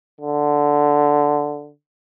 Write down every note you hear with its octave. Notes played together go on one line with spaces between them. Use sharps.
D3